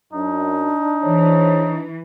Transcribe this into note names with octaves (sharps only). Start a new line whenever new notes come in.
F#2 D4 D#4
E3 G#4 C5 C#5